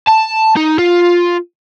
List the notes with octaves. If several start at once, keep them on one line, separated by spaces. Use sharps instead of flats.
A5
D#4
F4